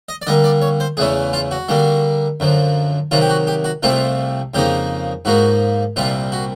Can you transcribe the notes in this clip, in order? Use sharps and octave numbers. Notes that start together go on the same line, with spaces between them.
D#5
D5
D3 G3 A#3 D#5
D5
C#5
C5
E2 C#3 E3 A3 C#4 G#4
F4
F#4
D3 G3 A#3 D4
F#2 D3 F3
C3 D#3 F#3 F4
G4
F#4
G4
F#4
C2 C3 F3 A3 C4 F4
F2 C#3 F3 A#3 D#4 G4
G#2 F3 A#3 D#4 F#4
C2 A#2 G3 C4 F4
F#4